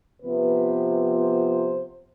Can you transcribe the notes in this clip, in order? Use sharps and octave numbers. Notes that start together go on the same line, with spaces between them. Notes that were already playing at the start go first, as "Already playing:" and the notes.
C3 F3 B3 B4
C5